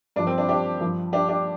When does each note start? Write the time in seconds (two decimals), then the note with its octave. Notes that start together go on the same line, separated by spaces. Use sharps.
0.16 G2 F3 D4
0.27 C4
0.38 D4
0.49 D4 G4
0.81 G2 F3
1.13 D4 G4
1.29 D4 G4